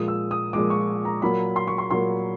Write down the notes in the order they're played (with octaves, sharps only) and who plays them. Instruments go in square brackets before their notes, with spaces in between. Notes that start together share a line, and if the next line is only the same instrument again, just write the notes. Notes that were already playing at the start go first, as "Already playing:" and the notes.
Already playing: [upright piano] A#2 F3 G#3 D#6
E6
D#6
A#2 F3 G#3 D6
C#6
A#5
A#2 F#3 A#3 B5
C6
C#6
C6
A#2 F#3 A#3 C6